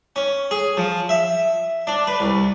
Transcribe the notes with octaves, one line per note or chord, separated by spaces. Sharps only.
C#4
G#4
F3
E5
D4
B4
C2